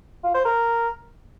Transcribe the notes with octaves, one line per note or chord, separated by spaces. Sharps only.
F4
C5
A#4